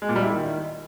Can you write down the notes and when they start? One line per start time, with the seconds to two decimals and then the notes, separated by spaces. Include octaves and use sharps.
0.02 G#3
0.09 A#2
0.16 G3
0.23 E4
0.30 D#3